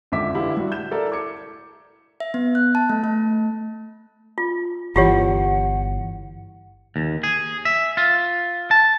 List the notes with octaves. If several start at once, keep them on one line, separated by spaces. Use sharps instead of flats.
G#1 F2 D3 E5 D6 B6
D3 E3 E4 G4 F5
G3 F#4
G6 E7
E4 A4 A#4 D5
D6 G#6 C#7
E5
B3
F#6
A5
A3
A3
F4
G1 E3 F4 G4 C#5 F#5
D#2
G#4
E5
F4
A5